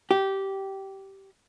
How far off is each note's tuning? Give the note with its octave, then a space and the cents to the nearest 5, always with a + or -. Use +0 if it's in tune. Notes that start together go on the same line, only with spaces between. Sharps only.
G4 -15